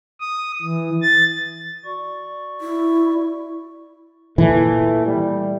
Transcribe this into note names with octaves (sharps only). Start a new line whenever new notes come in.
D#6
E3
A6
F#4 D5 C#6
E4
A#2 E3 A3
G3